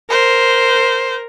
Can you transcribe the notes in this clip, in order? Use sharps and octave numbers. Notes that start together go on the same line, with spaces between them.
A#4 C5